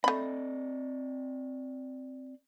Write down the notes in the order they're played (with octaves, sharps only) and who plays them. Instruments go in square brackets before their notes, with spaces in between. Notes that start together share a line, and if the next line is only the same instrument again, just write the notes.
[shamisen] A3 B5 [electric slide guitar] C4 D5 D#5